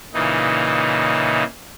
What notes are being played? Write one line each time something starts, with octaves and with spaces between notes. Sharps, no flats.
A#2 C#3 E3 D#4